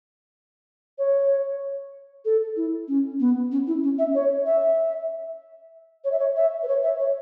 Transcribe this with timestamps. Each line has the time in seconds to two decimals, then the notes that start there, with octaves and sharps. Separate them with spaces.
0.98 C#5
2.25 A4
2.56 E4
2.88 C#4
3.20 B3
3.52 C#4
3.67 E4
3.83 C#4
3.99 E5
4.15 C#5
4.46 E5
6.04 C#5
6.12 E5
6.19 C#5
6.36 E5
6.63 B4
6.68 C#5
6.84 E5
7.00 C#5